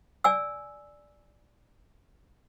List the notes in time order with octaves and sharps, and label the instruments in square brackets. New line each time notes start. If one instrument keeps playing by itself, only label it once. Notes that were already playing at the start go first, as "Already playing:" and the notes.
[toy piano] D5 G#5 E6